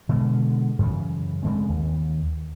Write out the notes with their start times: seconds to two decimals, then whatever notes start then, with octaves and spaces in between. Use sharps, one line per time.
0.09 B2 D3 G#3
0.79 F#2 C#3 E3
1.43 C#3 G#3 A3 C4
1.69 D#2